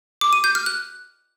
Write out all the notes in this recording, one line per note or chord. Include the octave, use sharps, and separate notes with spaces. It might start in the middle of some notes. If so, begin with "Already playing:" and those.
D6
D#7
G6
F6
F#6